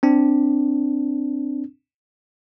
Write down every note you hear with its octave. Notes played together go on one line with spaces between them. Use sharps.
C4 D4